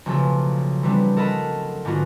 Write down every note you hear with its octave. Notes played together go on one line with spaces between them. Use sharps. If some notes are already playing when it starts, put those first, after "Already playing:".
B1 C#3 F3 A3
E3 F#3 G3 B3 C4 D4
A4 A#4 D#5 F#5 A5 B5
G#2 D3 A#3 B3 F4 F#4